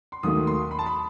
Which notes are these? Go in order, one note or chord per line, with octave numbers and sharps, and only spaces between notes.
C6
D#2 D#3 F#3 A3 D#6
C6
B5
A5
B5